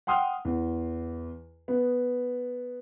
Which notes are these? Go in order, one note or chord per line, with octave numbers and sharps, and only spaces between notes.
F#5 G5 C6 D#6 F6
E2
B3